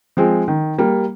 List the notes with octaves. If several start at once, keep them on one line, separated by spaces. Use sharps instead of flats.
F3 G#3 C4
D#3
G3 A#3